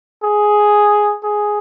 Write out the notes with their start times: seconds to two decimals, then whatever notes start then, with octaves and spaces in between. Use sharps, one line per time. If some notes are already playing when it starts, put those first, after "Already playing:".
0.23 G#4
1.23 G#4